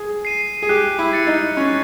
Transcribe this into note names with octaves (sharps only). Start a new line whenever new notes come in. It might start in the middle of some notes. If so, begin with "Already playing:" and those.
Already playing: G#4
C7 D#7
G#4
G4 F#6
E4
A6 C#7
D#4
C#4 F#6